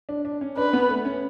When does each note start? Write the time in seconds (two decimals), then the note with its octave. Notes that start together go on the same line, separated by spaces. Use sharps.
0.09 D4
0.25 D4
0.41 C#4
0.57 D4 B4
0.73 B3
0.89 A3
1.05 C#4